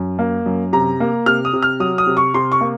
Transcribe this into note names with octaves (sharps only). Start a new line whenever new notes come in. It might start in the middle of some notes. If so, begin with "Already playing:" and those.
Already playing: F#2
A#3
F#2
C3 A#5
A#3
C3 F6
D#6
C3
F6
F#3 D#6
D#6
C3
C#6
C3 C6
C#6
A#3